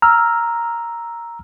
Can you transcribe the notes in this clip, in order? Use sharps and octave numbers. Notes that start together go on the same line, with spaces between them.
A#5 E6 F6